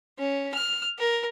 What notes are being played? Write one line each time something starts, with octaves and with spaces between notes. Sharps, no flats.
C#4
F6
A#4